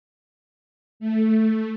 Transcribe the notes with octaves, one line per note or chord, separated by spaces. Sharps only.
A3